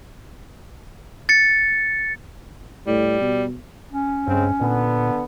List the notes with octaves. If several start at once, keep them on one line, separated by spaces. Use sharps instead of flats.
A6 C#7
A2 G3
B2
C#4
G2 C#3 G#3 C4
A#2 D3 B3